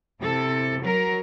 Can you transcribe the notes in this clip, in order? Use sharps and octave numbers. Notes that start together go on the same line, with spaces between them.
C3 E4 A4
F#3 A#4